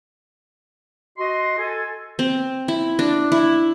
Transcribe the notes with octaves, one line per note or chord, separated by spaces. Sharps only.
F#4 D#5 C6
A4 G#5
C4
E4
D4
E4